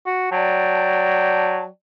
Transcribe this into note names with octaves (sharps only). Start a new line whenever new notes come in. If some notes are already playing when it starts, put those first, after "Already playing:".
F#4
F#3 D5 G5 A5